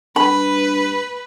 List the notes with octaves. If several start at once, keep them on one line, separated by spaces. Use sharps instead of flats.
G2 B4 B5